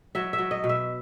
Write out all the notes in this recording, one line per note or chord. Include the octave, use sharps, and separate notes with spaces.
F#3 E5
E5
F#3
D#5
B2
E5